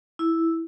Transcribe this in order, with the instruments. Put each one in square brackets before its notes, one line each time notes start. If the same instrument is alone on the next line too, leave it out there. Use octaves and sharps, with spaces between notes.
[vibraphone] E4